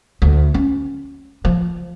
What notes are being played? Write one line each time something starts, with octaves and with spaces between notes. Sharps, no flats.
D2
C#4
F3